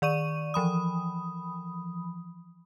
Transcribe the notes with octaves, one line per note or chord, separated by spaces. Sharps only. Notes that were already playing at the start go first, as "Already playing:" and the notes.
D#3 D5 C#6 D#7
E3 F3 B5 D#6